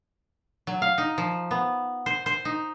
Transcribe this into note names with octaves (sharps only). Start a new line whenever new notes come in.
F#3
F5
D#4
F3
B3
C5
C5
D#4